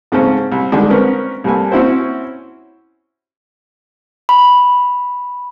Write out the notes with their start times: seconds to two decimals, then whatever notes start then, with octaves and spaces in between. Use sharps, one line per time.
0.12 G#2 C#3 A3 C4 C#4
0.52 C2
0.72 D3 D#3 G3 G#3 D4
0.90 C4 C#4 A#4 B4
1.44 C2 G3 A3 A#3 G#5
1.72 C4 C#4 E4 F#4 C5
4.29 B5